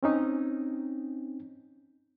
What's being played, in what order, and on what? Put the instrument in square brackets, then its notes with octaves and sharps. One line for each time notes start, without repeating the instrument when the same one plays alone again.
[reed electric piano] C4 C#4 D#4